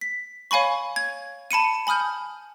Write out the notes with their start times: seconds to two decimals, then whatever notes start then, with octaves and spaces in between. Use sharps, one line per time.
0.01 B6
0.51 C#5 F5 G#5 B5 C#6
0.96 G#6
1.51 A5 B5 C#7 D#7
1.87 G#5 B5 D#6 F6 G6